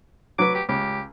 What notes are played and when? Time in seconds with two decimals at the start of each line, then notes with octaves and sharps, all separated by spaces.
0.39 F#3 B4 D6
0.55 G4
0.69 C#2 G4